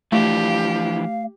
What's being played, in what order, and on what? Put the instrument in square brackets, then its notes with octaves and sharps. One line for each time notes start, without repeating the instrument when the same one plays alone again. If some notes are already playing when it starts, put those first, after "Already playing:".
[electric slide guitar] E3 F3 D4 [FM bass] A3 [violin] G4 [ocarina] F5